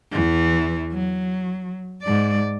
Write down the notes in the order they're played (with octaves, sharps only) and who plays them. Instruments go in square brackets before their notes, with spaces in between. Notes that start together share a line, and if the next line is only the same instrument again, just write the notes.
[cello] E2 E3
F#3
G#2 D5